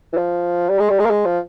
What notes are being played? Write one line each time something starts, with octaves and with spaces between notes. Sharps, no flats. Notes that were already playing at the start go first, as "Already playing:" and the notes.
E3
F3
G3
G#3
G3
G#3
A#3
G#3
F3